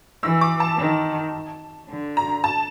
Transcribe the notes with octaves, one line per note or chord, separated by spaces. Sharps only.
E3 E6
D6
A5
D#3
D3
A#5
A5